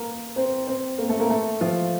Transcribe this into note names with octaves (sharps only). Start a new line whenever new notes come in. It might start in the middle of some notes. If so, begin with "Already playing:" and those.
Already playing: A#3 A#4
C4 C5
C4 C5
A#3 A#4
A3 A4
A#3 A#4
A3 A4
F3 F4